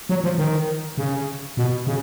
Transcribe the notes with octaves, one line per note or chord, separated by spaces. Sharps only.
F#3
F3
D#3
C#3
B2
C#3